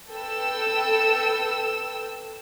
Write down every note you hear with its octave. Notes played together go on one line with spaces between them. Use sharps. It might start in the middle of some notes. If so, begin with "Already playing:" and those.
A4 B4 G5 E6